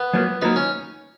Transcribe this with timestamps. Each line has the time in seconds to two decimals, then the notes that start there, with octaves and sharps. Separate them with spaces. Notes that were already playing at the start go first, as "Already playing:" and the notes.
Already playing: B3
0.13 F#3 A#3 F4 B4
0.42 F#3 A#3 D#4 F4 B4
0.56 C#4